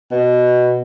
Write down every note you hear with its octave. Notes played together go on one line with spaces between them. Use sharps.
B2